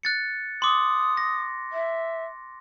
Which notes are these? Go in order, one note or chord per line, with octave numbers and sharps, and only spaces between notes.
F#6 A6 C#7
C6 D6 D#6
A#6
E5